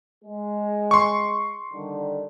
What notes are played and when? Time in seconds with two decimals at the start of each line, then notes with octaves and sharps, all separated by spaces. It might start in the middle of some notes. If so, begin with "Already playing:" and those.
0.25 G#3
0.91 C6 C#6
1.73 D3 D#3 G3